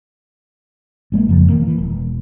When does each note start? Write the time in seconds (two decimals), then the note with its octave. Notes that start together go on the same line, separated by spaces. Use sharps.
1.12 A1 G#3 A#3
1.29 F2 C#3 F3
1.49 D#1 D#3 E3 A#3
1.65 E3
1.78 E1